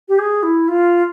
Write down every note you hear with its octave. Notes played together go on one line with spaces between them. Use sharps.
G4
G#4
E4
F4